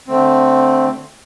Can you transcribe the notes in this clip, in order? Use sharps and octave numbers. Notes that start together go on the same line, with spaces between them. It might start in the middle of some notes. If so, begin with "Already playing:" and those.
D3 A3 C4